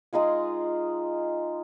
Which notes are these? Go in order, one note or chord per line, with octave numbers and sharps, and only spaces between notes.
G#3 D#4 F4 G#4